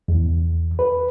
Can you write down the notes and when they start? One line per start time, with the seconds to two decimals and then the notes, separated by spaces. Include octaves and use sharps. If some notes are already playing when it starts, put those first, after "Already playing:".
0.08 E2
0.79 B4